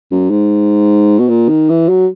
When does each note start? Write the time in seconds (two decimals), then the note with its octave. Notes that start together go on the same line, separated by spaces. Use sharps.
0.11 F#2
0.30 G#2
1.19 B2
1.29 A#2
1.49 D#3
1.69 E3
1.89 F#3